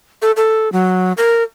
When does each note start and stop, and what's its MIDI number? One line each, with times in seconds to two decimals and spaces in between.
0.22 0.31 69
0.37 0.71 69
0.72 1.12 54
1.17 1.43 70